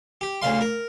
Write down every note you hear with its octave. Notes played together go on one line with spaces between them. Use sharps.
G4
D2 C#3 F5 C6
A#4